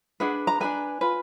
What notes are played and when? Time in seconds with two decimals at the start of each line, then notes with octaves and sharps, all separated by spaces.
0.20 D4 G#4 B4 F#5
0.47 A#5
0.60 D4 G#4 B4 G#5
1.01 F4 B4